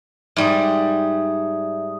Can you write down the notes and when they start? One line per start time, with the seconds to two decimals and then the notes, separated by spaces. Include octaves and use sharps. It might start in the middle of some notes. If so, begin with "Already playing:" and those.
0.36 G#2 G3 E5 D#6